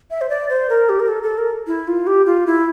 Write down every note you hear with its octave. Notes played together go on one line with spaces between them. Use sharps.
E5
C5
D5
C5
A#4
G4
A#4
A4
A4
A#4
E4
F4
G4
F4
E4